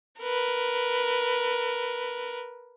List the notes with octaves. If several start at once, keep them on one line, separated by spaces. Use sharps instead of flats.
A#4 B4